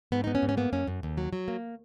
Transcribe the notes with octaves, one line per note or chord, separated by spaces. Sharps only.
G#2 B3
B3 D#4
C#4
G#2
C#4
A#3 B3
F#2 C#4
F#2
D#2
F#3
F#3
A#3